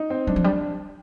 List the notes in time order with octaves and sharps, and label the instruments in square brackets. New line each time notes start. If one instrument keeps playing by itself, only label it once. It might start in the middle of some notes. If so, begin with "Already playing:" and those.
Already playing: [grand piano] D#4
C4
[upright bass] G3 [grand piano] D4
[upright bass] F3
[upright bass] G3 [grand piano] D4